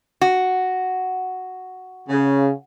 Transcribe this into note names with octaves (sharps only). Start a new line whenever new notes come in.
F#4
C#3